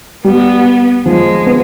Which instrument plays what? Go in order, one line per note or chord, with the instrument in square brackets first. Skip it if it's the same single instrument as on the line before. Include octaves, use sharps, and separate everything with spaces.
[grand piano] G3 [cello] B3
[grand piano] F3 [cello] G#3
[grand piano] B3